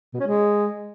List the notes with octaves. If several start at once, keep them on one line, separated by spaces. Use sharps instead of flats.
B2
C#4
G#3